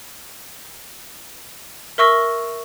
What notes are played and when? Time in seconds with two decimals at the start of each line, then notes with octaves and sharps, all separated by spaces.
1.98 A#4 E5 C#6 E6 A#6